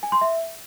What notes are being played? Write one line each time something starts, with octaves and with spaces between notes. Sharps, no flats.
G#5
C6
E5